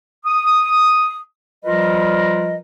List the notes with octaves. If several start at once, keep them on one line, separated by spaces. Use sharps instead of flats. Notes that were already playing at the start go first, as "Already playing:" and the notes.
D#6
F3 G3 F4 A#4 B4 D#5